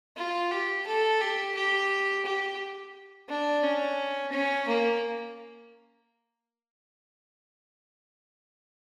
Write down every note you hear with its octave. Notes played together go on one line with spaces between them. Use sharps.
F4
G4
A4
G4
G4
G4
D4
C#4
C#4
A#3